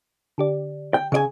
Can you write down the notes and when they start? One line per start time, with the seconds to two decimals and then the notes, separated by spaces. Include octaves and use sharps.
0.38 D3 G4 D5
0.94 G5
1.12 C#3 D5 G#5